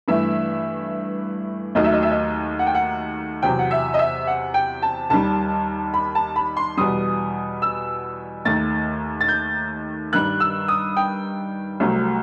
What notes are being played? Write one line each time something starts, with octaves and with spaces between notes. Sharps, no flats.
G2 E3 A3 E5
D#2 D#3 F#3 A3 D#5
E5
D#5
E5
D#5
F#5
G5
F#5
E2 C3 F#3 G5
F#5
E5
D#5
E5
F#5
G5
A5
D#2 D#3 G3 A5
B5
A5
B5
C6
E2 B2 G3 D#6
E6
D#2 D#3 A3 A6
A6
G6
G2 D#3 G3 F#6
E6
D#6
G5
C2 C3 F#3 A3